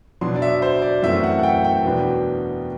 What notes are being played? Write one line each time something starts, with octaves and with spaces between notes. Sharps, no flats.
B2 F#3 B3 D4 C6
D5
E5
C5
D5
F#2 E3 A3 C4 E5
F#5
F#5
G5
G5
E2 B2 F#3 B3 D4